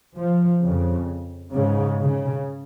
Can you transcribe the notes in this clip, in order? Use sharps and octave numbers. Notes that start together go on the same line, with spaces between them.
F3
F2 C#3
G#2 C#3
C#3